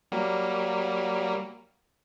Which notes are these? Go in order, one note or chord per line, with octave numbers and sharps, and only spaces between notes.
F#3 G3 A#3